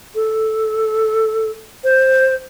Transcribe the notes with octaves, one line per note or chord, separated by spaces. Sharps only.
A4
C5